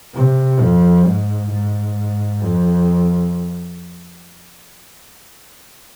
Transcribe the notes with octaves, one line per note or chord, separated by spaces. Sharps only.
C3
F2
G#2
G#2
F2